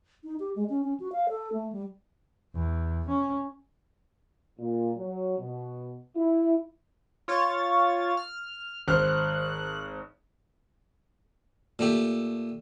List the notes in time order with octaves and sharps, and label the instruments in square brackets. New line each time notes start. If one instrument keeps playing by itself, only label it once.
[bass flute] D#4
G4
G#3
C#4
C#4
F#4
F5
A4
A3
G3
[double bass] E2
C#4
[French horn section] A#2
F#3
B2
E4
[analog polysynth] F4 C#5 A6
F6
[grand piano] G#1 C5 F6 [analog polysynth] F#6
[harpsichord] A#2 A3 G4